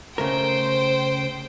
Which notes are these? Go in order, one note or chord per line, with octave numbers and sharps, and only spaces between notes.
C#3 A3 A#4 C5 G5